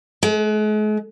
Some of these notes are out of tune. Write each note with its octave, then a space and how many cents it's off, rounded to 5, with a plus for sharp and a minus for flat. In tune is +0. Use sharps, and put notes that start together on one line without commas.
G#3 +45